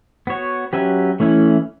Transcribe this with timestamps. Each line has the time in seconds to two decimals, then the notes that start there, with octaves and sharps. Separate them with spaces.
0.27 B3 F#4 C#5
0.73 F#3 C#4 G4 B4 E5
1.20 E3 A3 C#4 E4